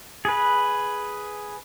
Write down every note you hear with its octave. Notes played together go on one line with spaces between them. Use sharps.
G#4 B4